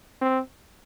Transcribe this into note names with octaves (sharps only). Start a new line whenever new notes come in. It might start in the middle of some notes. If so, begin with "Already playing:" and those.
C4